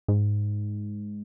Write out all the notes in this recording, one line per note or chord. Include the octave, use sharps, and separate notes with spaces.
G#2